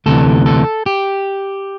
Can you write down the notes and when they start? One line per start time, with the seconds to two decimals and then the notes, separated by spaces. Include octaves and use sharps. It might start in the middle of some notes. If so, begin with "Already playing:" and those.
0.06 D2 C3 E3 A4
0.46 A4
0.86 G4